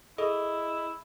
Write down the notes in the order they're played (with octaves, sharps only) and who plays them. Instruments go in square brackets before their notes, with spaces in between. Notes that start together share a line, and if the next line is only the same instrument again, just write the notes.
[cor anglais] E4 [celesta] G#4 [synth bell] A4 [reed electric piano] D#5